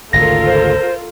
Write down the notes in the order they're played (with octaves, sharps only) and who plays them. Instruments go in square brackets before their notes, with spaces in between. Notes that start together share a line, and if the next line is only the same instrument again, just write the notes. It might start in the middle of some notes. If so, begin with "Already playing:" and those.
[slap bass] G#1 D2 C#3 [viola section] F4 A4 A#4 [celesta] A#6
[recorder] C5